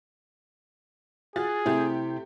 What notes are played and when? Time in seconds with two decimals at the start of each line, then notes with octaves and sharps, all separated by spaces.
1.36 F4 F#4 G#4 A6
1.66 C3 A3 E4 G4